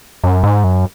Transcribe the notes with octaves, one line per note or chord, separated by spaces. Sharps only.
F#2
G#2
F#2